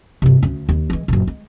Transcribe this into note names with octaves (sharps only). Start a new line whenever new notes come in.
G2 C3
D2 C#4
D#2
E3 G#3
F#1 A#2
G#3